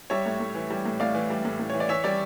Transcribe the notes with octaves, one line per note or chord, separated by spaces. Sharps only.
G3 C#5 E5
A2
A2
E3
G3
A2
A2 D5 F5
E3
G3
A2
A2
E3 C#5
D5
E3 C#5 E5
G3 D5